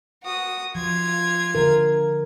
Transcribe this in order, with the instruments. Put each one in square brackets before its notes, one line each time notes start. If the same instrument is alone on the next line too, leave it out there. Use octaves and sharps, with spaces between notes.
[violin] F#4 D#6
[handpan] F3 [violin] F4 G#6
[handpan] D3 A#4